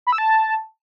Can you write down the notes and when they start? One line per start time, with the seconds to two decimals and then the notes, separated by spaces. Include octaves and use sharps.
0.07 B5
0.12 E6
0.18 A5